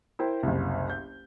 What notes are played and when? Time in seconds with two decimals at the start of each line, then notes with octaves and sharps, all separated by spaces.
0.19 E4 A#4 C5 G5
0.43 F#1 C2
0.90 G6